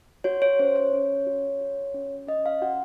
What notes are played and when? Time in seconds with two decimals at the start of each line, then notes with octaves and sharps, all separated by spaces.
0.24 F#4 C#5
0.42 C#5
0.59 C#4 C5
0.76 C#5
0.93 C#4
1.27 F#4
1.61 F#4
1.94 C#4
2.27 C#4 D#5
2.46 F5
2.62 F#4 F#5